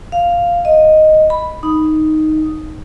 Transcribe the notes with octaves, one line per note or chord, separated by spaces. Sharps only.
F5
D#5
B5
D#4